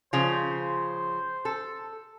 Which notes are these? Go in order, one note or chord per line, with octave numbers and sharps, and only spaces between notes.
C#3 F3 C5
A4